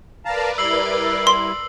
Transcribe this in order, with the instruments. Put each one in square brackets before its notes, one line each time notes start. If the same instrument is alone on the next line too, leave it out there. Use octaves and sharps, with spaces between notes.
[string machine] A#4 B4 D5 [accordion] F5 A5 A#5
[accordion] G3 E4 [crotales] E6 C7 F#7
[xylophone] C6